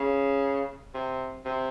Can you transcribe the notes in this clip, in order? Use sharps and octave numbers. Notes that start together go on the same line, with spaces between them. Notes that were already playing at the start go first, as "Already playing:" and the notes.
Already playing: C#3
C3
C3